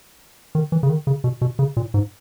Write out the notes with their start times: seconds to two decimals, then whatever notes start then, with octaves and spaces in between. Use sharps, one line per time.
0.55 D#3
0.72 E3
0.83 C#3
0.89 D#3
1.07 C#3
1.24 B2
1.41 B2
1.59 C#3
1.77 A#2
1.94 G#2